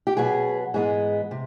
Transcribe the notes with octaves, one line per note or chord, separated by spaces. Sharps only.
G4
B2 F#3 B3 G#4
G#2 E3 G#3 B3 G#4
C3